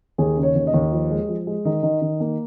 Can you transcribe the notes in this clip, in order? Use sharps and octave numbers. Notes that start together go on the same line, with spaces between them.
D#2 G#4
C#3
C#5
D#2
D#5
D#2
F3
G#3
F3
G#3
D#3 D#5
D#3
D#3
A#3